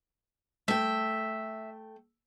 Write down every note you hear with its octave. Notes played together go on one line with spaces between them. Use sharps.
A3 E5 G5